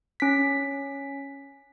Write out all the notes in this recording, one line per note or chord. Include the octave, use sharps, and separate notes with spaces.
C#4 B6